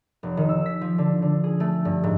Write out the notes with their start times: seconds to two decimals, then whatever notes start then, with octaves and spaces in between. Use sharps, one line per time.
0.23 F1
0.37 D#3
0.49 E6
0.66 B6
0.81 F3
0.98 D3
1.22 D3
1.44 G#4
1.60 A3
1.85 G2
2.04 G#2